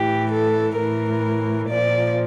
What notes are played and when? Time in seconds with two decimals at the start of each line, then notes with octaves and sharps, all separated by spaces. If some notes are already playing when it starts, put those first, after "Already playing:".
Already playing: A2 E3 G4
0.32 A4
0.77 A2 E3 A#4
1.70 A#2 F3 D5